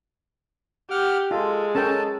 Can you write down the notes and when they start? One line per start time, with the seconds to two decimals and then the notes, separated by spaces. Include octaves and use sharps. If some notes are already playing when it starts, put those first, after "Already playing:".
0.91 G4 F#5 F6
1.31 G#3 F4 A4
1.75 C#4 A4 A#4 G5 A5